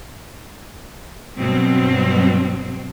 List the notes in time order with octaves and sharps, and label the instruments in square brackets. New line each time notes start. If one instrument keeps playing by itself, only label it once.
[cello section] G2 B2 F#3 C4